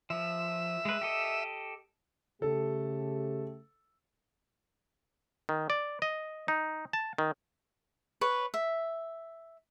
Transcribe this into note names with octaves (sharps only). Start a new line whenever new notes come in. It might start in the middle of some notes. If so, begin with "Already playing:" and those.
F3 E5
G#3 B4
G4 A4 D#5
C#3 A3 G4 A4
D#3
D5
D#5
D#4
A5
D#3
B4 C#5
E5